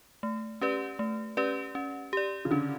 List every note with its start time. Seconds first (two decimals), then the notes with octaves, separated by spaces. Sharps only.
0.23 A3
0.61 C#4 G4 B4 D5
0.99 A3
1.37 C#4 G4 B4 D5
1.75 C#4
2.13 G4 D5
2.45 C#3
2.51 D3 C#4